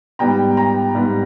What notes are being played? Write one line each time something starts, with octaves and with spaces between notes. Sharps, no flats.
G#2 G3 B3 G5 A#5
G5 A#5
G#2 G3 B3